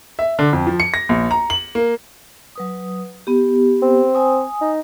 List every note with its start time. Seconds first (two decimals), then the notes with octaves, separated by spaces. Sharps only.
0.19 E5
0.39 D3
0.53 F2
0.67 F3
0.80 C#7
0.94 A#6
1.09 A#1
1.31 A#5
1.50 F#7
1.75 A#3
2.56 F#3 B4 D#6
3.27 B3 G4
3.82 C4
4.15 G#5 D#6
4.61 D#4